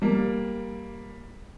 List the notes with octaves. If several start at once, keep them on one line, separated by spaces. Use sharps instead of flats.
G3 A#3